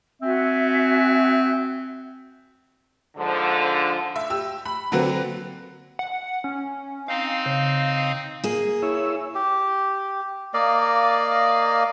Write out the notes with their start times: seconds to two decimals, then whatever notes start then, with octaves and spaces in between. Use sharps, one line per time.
0.22 C4 F#4 E5 G#5
3.17 G#2 D3 F3
4.16 E5
4.30 G4 E6
4.65 B5
4.92 D3 F#3 A#3 C4 F#4 B4
5.99 F#5
6.44 C#4
7.08 C4 D#4 F5
7.46 C#3
8.44 A#3 G#4
8.82 E4 C#5 E6
9.35 G4
10.54 A#3 D5 D#5 F5